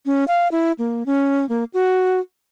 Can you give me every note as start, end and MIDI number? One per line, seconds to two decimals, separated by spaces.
0.06 0.24 61
0.28 0.48 77
0.52 0.72 64
0.79 1.06 58
1.06 1.48 61
1.49 1.64 58
1.74 2.20 66